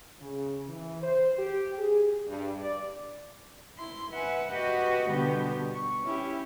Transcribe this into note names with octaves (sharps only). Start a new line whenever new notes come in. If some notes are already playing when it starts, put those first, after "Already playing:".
C#3
E3
C5
G4
G#4
G2
D5
E4 C6
B4 E5 F#5 G#5
F#4 G4 B4 D#5 F#5
B2 D3 G3 B3 F#4 G4
C#6
C#4 E4 G4